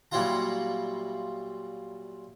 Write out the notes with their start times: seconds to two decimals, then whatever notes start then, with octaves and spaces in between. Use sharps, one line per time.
0.11 A#2 F#3 G3 E4 F4 A#5